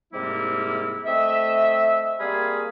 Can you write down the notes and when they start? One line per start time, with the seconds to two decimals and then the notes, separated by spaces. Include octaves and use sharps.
0.13 G#2 C3 G3 A#3 C4 E4
1.06 A3 C4 D#5 E5
2.20 G3 A#3 C4 G#4 F5 B5